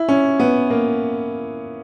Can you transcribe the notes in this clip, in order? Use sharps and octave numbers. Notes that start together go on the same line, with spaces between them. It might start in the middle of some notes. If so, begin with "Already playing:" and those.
Already playing: E4
C#4
B3
A#3